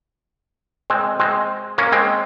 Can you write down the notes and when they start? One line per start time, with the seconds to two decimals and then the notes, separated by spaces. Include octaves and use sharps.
0.90 G#3 C4
1.20 G#3 C4
1.78 A#3 C#4
1.92 G#3 C4